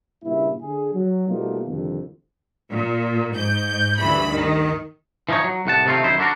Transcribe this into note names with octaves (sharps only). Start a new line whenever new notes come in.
G2 A#2 C#3 A#3 E4
D3 G#4
F#3
B2 G3 A3 A#3 D#4 F4
C2 F2 D3 D#3
A#2
G#2 G6
D2 G2 E3 B5
D#3
E3 F3 C4 D#4 C#5
F#3
C2 A2 F#5 A5
C3 D#3 A3 C4 F4
F#2 D#3 E4 C5
D3 D4 F#4 A#4